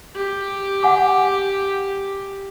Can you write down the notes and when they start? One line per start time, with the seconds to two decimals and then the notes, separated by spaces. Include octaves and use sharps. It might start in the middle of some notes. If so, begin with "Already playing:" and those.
0.15 G4
0.83 F#5 G#5 D6